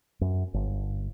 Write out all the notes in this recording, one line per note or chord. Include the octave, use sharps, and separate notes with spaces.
F#2
G1